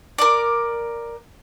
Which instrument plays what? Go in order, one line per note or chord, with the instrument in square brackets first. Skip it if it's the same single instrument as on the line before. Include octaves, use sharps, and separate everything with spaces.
[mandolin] A#4 D5